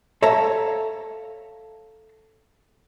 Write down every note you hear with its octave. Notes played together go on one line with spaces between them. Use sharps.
A4 C#5 E5 F5 A5 A#5